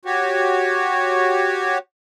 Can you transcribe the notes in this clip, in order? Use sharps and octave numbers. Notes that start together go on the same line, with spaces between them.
F#4 G4 C#5